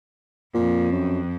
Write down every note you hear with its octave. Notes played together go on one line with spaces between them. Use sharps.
F2 A#2
F#2